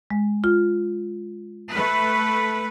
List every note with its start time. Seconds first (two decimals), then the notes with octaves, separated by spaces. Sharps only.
0.10 G#3
0.44 F4
1.70 A3 B4